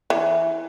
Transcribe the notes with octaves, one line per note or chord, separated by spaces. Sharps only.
E3